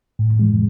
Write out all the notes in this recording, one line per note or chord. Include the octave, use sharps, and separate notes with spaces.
A2
E3 G#3